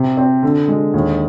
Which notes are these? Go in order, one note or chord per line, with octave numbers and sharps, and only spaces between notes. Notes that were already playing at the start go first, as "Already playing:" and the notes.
Already playing: C3
C4
D3
G#3
D#2